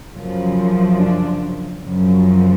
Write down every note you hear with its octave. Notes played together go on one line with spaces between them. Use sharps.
F#2 C#3 F3
D4
F#2 C#3 F3